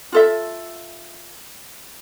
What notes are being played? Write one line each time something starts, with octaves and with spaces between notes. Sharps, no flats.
F4 A4 E5